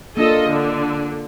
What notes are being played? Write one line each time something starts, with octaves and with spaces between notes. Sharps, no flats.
A#3 D4 F4 A4 D#5
D3